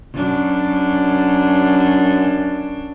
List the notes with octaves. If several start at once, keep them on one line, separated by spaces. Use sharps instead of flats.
F#2 D4